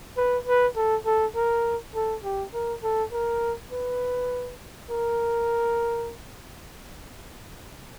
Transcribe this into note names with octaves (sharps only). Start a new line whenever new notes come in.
B4
B4
A4
A4
A#4
A4
G4
A#4
A4
A#4
B4
A#4